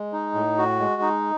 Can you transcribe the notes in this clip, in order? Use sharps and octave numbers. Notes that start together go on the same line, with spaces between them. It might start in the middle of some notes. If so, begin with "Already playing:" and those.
Already playing: G#3
D#4
A2
F#4
G#3
D#4